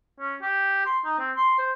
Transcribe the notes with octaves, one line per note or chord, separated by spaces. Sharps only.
C#4
G4
C6
D#4
C4
C6
C5